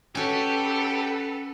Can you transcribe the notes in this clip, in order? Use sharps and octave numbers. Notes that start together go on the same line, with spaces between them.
C#4 F#4 G4 A4 B4